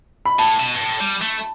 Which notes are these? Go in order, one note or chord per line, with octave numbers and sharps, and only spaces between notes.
B5
A2 A5
B2
G2
A2
G3
A3